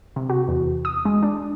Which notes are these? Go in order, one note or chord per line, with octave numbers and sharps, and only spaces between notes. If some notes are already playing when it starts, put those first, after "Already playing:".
C3
F#4
E2
D#6
G#3
D4